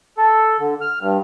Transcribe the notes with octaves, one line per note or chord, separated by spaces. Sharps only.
A4
D3
F6
G2